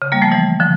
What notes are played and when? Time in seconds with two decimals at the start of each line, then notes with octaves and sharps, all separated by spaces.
0.02 C#3
0.12 G3 A#3
0.22 F3 A3
0.32 E3 G3
0.60 D3 F3